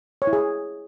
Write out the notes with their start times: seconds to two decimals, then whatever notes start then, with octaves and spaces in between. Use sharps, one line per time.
0.22 C#5
0.27 E4
0.33 G#4